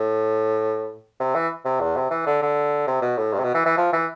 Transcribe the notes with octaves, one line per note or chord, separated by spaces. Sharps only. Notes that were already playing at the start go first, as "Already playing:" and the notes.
Already playing: A2
C3
E3
C3
E2
C3
E3
D3
D3
C3
B2
A2
G2
C3
B2
E3
E3
F3
E3